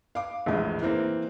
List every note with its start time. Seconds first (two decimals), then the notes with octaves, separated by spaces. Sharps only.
0.15 F5 D6
0.46 A#1 E2 A2 G#3
0.82 E3 A#3 C4